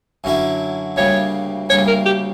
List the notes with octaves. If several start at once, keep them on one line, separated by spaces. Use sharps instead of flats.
F#2 D3 F#3 C#4 E4
D2 C#3 G3 A#3 C#5
D2 C#3 G3 A#3 C#5
A#4
G4